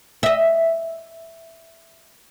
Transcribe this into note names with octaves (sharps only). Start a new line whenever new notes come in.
D#5 E5